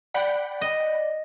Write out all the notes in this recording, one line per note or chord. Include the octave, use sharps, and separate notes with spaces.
D5 F#5 G5 B5
D#5